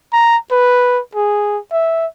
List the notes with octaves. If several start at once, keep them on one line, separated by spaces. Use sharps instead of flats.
A#5
B4
G#4
E5